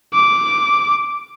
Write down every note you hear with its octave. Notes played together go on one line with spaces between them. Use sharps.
D6